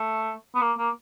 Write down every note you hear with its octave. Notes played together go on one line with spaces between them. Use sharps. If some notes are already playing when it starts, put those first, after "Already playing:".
Already playing: A3
B3
A#3
A#3